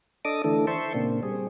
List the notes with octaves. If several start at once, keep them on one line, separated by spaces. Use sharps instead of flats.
D4 A4 D#5 D6 D#6
D3 E3 A3 D4 A4
C5 E5 A5 C6 C#6
A#2 C#3 A#3 C4 D4
G3 C4 G#4